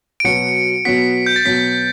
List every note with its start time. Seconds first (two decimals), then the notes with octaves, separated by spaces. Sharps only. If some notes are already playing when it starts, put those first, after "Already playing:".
0.20 D7
0.24 B2 F#3 B3 F#4 C#7
0.85 B2 F#3 B3 F#4 B6
1.26 G6
1.36 A6
1.45 B2 F#3 B3 B6